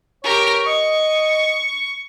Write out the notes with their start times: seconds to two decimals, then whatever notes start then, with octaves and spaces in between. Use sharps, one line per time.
0.24 G4 A#4 C#5
0.66 D#5 C#6